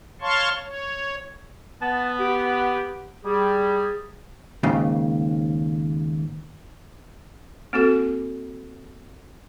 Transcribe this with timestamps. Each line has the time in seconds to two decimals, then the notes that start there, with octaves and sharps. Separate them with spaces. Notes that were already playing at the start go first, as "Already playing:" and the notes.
0.21 C#5 F5 A5 C6 C#6
0.64 C#5
1.82 B3 A5
2.20 G4
3.25 G3 G#4
4.63 D#2 G#2 C#3
7.73 A#3 C4 F#4 A4